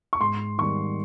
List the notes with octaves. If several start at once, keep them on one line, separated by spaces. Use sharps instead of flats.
C#6
G#2 C6
D#3 G3 C#6